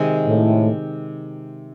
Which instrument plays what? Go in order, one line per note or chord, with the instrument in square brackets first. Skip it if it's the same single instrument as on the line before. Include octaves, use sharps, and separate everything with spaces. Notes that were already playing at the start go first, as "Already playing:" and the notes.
Already playing: [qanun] C3 D#3 G#3
[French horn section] A2